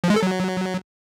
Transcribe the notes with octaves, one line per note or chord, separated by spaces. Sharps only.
F3
G#3
A4
F#3